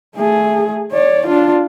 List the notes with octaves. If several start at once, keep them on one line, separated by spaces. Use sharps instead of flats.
A3 G#4
C#5 D5
D4 F4